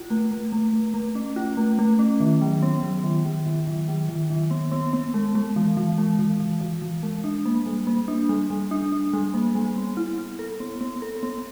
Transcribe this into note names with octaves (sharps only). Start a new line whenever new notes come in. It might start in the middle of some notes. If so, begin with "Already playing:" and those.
Already playing: F4
A3
A3
A3
A3
A3
C#4
F4
A3
A3
C#4
D#3
F#3
B3
F#3
D#3
F#3
D#3
D#3
F#3
D#3
D#3
B3
B3
B3
G#3
G#3
E3
E3
G#3
E3
E3
E3
E3
G#3
D4
A#3
G3
A#3
D4
G3
G3
D4
D4
G3
A#3
G3
B3
E4
E4
A4
B3
B3
A4
B3